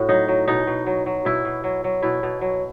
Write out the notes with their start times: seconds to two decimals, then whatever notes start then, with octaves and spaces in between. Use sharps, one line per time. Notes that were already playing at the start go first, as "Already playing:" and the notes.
Already playing: A2 F#4
0.09 F#3 D#4
0.28 F#3
0.48 B2 D#4
0.67 B2
0.86 F#3
1.06 F#3
1.25 B2 E4
1.45 B2
1.64 F#3
1.84 F#3
2.03 B2 E4
2.23 B2
2.41 F#3